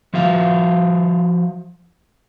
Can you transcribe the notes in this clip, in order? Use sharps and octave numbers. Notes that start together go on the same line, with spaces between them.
F3 F#4 E5 F5